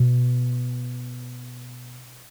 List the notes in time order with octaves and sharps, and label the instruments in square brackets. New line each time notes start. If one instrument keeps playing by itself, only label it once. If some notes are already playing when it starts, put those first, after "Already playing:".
Already playing: [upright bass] B2